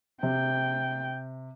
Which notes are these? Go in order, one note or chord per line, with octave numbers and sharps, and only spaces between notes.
C3 G5